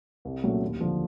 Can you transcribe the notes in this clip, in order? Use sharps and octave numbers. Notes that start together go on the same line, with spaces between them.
C2
A#2 F#3 A3 C#4
D#2
D3 F3